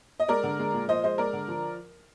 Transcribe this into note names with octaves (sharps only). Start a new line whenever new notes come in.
D#5
G#3 A#4 D5
D3
G#3
A#2
F3 C5 D#5
G#3 C5 D#5
G#3 A#4 D5
D3
F3